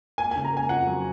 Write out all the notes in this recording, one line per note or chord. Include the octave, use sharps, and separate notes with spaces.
A#3 G#5
G#5
C#3
A#5
A#3 G#5
F2 F#5
F#3